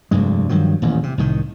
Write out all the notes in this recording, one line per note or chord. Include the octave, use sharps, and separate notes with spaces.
F1 D2 G2 G#3
G2 D#3 F3 F#3
D#1 A1 E2
C3
C2 A2 D#3